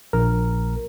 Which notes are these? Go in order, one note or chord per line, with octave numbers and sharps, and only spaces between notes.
A#1 A#4